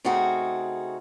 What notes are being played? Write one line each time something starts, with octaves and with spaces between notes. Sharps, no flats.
C#3 A3 C4 D#4 F#4 G#4